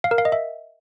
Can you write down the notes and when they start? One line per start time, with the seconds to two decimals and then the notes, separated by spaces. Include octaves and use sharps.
0.04 F5
0.11 A#4
0.18 F5
0.25 D#5
0.32 E5